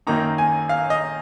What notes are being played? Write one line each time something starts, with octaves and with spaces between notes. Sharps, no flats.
F#2 D#3 A#3 D#4 A#5
G#5
F5
D#5